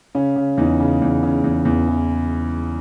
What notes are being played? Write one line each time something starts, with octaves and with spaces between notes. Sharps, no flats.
C#3 C#4
C#3
E2 D#4
C#3
E2
C#3
E2
E2
E3